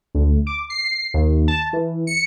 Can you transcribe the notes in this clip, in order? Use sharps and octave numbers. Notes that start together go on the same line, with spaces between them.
D2
D6
C7
D#2
A5
E3
C#7